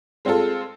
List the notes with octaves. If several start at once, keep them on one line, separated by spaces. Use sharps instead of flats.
G#3 C4 F4 A4